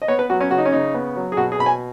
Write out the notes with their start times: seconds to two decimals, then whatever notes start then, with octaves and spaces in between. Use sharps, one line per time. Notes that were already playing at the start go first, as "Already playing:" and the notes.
0.02 D#5
0.08 B3 C#5
0.19 B4
0.30 F#3 F#4
0.40 C#4
0.51 C#3 F#4
0.58 D#4
0.65 C#4
0.72 C#3 D#4
0.94 B3
1.16 F#3
1.32 G#4
1.37 B2 F#4
1.52 G#4
1.59 B2 B5
1.66 G#5